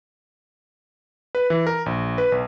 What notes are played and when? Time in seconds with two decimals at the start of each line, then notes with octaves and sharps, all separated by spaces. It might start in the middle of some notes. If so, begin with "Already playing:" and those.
1.35 B4
1.50 E3
1.67 A#4
1.86 A#1
2.18 B4
2.32 B1